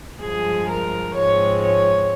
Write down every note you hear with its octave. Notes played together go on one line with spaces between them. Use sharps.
G2 F3 G#3 G#4
A#4
G#2 F3 G#3 C4 C#5
C#5